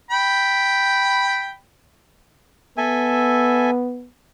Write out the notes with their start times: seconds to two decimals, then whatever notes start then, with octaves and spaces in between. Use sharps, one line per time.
0.11 G5 B5
2.78 B3 A4 E5 G#5